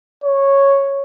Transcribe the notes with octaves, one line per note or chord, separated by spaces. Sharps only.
C#5